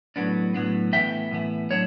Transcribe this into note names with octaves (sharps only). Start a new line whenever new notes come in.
A2 F#3 B3 D4
A2 F#3 B3 D4
A2 E3 B3 E5 G5
A2 E3 B3
A2 F#3 D4 C#5